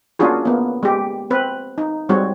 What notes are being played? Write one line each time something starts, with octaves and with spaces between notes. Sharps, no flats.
A#3 C#4 D4 F4 F#4 G#4
A#3 B3
G#3 G4
C4 B4
D#4
G3 G#3 C4 F#4 C#5